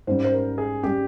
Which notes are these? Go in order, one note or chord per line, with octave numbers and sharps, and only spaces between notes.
G#2 G3 C#4 C5
C5
A#4
G#4
G3 C#4 G4